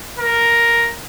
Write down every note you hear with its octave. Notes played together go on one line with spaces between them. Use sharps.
A#4